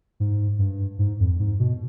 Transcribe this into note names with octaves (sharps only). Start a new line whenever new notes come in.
G#2
G2
G#2
F2
G#2
B2